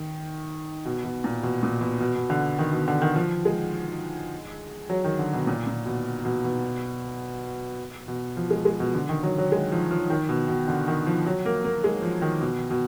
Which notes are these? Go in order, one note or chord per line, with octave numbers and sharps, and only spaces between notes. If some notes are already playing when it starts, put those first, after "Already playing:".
Already playing: D#3
B2
B2
A#2
B2
A#2
B2
B2
B2
D3
D#3
B2
D3
D#3
F3
G#3
F#3
D#3
D3
B2
A#2
A#2
B2
B2
B2
B2
F3
G#3
G#3
B2
D3
D#3
F#3
F#3
G#3
F3
F3
D#3
B2
B2
D3
D#3
F3
F#3
A#3
A#3
G#3
F3
D#3
B2
B2